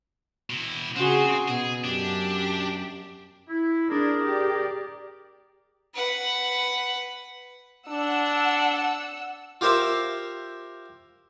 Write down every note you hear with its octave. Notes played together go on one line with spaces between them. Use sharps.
B2 E4
C#3 C4 F#4 G#4
B2 G#4
F#2 D4 G4
E4
D4 G#4 A#4
G4 D5
B4 F#5
D4 F#5 E6
F4 G4 A#4 C5 E5 F5